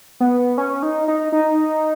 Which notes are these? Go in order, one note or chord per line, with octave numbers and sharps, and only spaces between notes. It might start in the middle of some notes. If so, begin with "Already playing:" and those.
B3
C#4
D#4
D#4
D#4